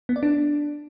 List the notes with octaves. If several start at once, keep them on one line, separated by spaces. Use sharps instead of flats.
B3
D5
D4